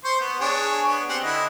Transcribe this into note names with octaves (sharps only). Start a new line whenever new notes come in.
C5 C6 C#6
B3
D4 G#4 C#5
B3
C4 G4 F#5
D3 E4 D#5